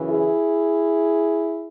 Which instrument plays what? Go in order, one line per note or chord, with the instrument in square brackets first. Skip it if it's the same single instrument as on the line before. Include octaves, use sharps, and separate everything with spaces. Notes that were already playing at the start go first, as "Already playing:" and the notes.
Already playing: [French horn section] F#2 C#3 E3
E4 G#4